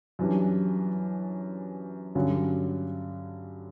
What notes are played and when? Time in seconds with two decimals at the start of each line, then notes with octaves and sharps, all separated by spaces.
0.19 F#2 E3 G3 D4
2.15 G2 D3 F#3 C#4